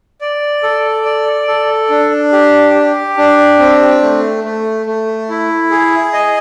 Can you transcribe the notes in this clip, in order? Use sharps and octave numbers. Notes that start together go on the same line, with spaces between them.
D5
A4
D5
A4
D4
G4
G4
D4
C4
A3
A3
A3
E4
G#4
D#5